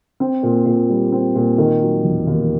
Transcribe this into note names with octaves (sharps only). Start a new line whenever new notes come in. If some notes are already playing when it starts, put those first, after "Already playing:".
C4
A#2
A#2
G3
C4
A#2
D#3
F#3
E1
D#2